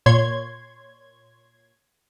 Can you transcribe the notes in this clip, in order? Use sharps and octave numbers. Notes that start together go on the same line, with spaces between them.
A#2 C#5 C6 G#6